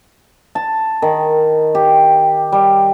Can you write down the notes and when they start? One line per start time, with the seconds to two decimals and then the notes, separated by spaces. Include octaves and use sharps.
0.55 A5
1.02 D#3
1.75 G4
2.52 G3